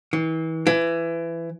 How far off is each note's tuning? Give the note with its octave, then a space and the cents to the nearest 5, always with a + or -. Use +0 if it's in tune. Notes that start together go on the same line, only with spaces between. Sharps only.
E3 -35
E3 +20